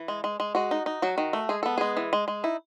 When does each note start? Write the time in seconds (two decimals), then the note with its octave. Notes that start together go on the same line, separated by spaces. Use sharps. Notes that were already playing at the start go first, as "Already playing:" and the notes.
Already playing: E3
0.08 G#3
0.24 G#3
0.40 G#3
0.55 G#3 F#4
0.71 D#4
0.86 D#4
1.02 F#3 F#4
1.18 D#3
1.33 A3
1.49 G#3 G#4
1.63 B3 A4
1.78 G#3 G#4
1.97 E3
2.13 G#3
2.28 G#3
2.44 D#4 E4